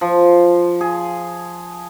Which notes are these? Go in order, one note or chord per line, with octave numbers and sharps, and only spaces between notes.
F3
G#4